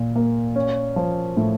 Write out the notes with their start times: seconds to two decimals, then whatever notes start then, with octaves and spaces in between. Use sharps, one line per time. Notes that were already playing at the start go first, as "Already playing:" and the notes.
Already playing: A#2
0.16 A#3
0.56 C#4
0.96 F3
1.37 A2